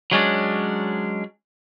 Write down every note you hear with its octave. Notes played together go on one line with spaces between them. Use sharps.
F#3 G#3 C#4 D4